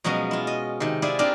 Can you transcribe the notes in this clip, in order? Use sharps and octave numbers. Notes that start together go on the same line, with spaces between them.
B2 F3 F#3 G#3 C#4
E4 F4
D#5
C3 D#3
E4 F4 G#4 D5 E5
A#3 C4 D4 F4 G4 A#4